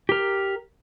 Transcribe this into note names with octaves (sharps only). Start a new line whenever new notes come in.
G4 A#4